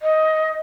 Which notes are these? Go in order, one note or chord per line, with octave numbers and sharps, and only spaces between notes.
D#5